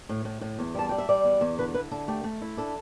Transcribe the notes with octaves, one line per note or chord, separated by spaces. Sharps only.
A2
A2
A2
E2
G3 A5
G3 G5
E5
G3 D5
E2
E2
D3 B4
E4 B4
D3 A4
A3 G4
A3
E4
D4 A4